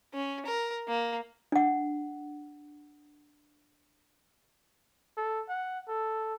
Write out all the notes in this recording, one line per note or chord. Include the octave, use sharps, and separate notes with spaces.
C#4
A#4
A#3
D4 F#5
A4
F#5
A4